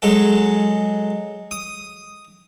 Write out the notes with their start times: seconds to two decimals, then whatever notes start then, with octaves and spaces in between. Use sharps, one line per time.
0.02 F#3 G#3 A4
1.51 D#6